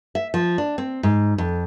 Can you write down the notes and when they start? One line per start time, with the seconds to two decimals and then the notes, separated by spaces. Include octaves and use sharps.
0.15 E5
0.34 F3
0.58 D4
0.78 C4
1.03 G#2
1.38 F2